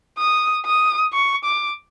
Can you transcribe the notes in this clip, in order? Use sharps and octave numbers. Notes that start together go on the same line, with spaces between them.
D#6
D#6
C#6
D6